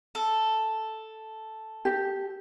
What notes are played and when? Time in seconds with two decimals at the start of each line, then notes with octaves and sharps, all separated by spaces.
0.15 A4
1.85 G4